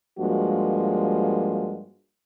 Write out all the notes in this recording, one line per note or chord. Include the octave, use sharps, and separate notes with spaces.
G2 F3 G#3 A#3 F#4